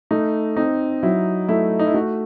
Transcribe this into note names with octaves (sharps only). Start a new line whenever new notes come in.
A3 D#4
C4 D#4
F#3 E4
A3 E4
D#4
E4
A3 F#4